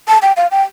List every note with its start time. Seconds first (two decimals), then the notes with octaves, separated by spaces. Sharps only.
0.08 A5
0.22 G5
0.37 F5
0.51 G5